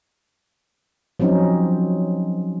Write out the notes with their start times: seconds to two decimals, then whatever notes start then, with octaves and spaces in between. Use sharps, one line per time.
1.20 F3 F#3 C4 C#4 D#4